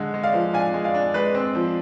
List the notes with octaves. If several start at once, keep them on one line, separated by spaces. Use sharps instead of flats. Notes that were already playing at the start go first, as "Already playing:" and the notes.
Already playing: D3 G#3
G#3
D5 F5
F3
D4 F5 G#5
G#3
D5 F5
D4
G#3 B4 D5
C4
F3